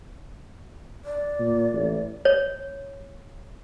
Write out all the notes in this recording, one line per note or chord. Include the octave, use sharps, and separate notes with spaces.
D5
A#2
A1
C#5